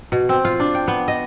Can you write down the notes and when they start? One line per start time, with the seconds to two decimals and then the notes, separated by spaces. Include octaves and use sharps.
0.12 B2
0.29 C4
0.45 F4
0.60 D4
0.75 G5
0.88 B3
1.08 D#5